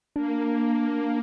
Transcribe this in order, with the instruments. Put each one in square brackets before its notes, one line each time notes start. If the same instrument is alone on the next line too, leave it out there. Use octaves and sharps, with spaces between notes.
[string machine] A#3 [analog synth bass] D4